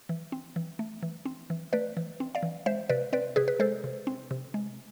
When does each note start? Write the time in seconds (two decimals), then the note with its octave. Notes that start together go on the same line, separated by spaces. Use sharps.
0.09 E3
0.32 C4
0.56 E3
0.79 A3
1.03 E3
1.25 C4
1.50 E3
1.73 A3 B4 D5
1.97 E3
2.20 C4
2.35 D5 F5
2.43 E3
2.66 G#3 C5 E5
2.89 C3 B4 D5
3.13 C4 B4 D5
3.36 C3 G#4 B4
3.48 B4
3.59 G#3 A4 C5
3.84 C3
4.07 C4
4.31 C3
4.54 G#3